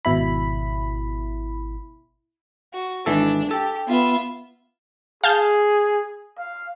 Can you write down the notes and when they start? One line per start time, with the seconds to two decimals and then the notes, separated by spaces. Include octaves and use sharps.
0.05 G#1 B2 E4 B5
2.73 F#4
3.06 G#1 E3 D4 A4
3.51 G4 A4
3.88 B3 F4 E5
5.24 G#4 F5 A5 G6
6.38 F5